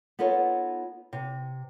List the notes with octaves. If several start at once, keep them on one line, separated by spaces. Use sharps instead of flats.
B3 D#4 F4 A4 C#5
C3